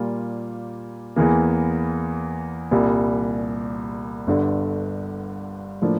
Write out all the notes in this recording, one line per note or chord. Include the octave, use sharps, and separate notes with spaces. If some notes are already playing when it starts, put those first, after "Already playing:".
Already playing: A#2 G3 A#3 F4
E2 E3 A#3
C2 A#2 G3
G1 G2 D3
A2 F3 A#3 D4